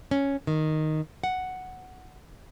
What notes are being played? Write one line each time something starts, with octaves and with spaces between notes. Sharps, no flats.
C#4
D#3
F#5